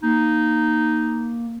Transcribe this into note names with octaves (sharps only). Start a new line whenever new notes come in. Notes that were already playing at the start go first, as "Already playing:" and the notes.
A#3 D#4